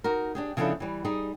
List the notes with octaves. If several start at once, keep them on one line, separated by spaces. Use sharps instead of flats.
D#4 F#4 A#4
D4 G4 G#4
C#3 F3 B3 D4 E4 A4
E3 G3
G3 D#4 G#4